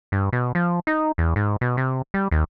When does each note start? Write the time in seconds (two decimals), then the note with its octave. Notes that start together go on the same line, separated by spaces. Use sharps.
0.12 G2
0.33 B2
0.55 F3
0.87 D#4
1.18 E2
1.36 G#2
1.61 B2
1.77 C3
2.14 G3
2.31 D#2